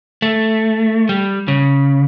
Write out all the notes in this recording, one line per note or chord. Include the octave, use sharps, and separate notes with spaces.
A3
G3
C#3